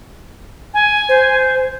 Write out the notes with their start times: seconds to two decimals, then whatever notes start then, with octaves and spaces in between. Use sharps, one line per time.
0.74 G#5
1.09 C5